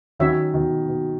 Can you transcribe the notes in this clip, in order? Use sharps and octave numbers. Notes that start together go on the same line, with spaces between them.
D#3 F#3 C#4 F#4 C#5 E5
B2 D#3
B2